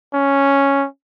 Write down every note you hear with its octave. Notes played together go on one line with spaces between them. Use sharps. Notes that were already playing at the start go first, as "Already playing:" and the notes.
C#4